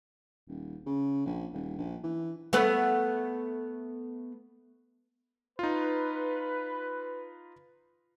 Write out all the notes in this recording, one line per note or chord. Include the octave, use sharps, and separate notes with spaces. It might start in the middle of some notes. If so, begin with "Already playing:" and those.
D#1
C#3
A#1
D#1
A#1
E3
A3 B3 B4
D#4 F4 B4